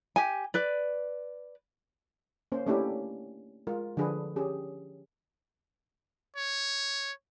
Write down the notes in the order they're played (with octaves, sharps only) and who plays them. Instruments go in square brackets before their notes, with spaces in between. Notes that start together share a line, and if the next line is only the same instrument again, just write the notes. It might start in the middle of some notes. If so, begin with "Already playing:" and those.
[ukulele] G4 G#5
B4 D5
[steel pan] A#3 C#4 C5
A3 A#3 C#4 D4 E4 G4
G#3 F4 A#4
D3 F3 D4 G#4 B4
C#4 G4 G#4
[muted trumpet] C#5